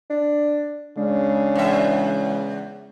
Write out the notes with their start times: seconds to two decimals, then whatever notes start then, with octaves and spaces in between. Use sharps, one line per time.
0.10 D4
0.98 C#3 G#3 D4
1.55 E2 E5